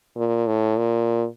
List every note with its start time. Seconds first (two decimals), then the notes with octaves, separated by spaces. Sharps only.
0.16 A#2
0.47 A2
0.78 A#2